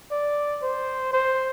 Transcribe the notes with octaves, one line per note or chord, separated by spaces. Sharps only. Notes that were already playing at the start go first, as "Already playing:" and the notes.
D5
C5
C5